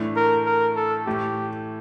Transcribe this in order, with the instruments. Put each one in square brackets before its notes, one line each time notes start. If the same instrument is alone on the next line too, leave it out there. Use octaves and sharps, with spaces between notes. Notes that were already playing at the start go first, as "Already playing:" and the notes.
Already playing: [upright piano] A2 E3 A3 D4
[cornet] A#4
A#4
A4
[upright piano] A2 E3 A3 [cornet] G4